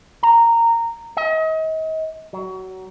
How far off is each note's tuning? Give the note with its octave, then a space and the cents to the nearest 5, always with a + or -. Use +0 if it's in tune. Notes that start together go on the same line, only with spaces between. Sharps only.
A#5 -10
D#5 +35
F#3 +25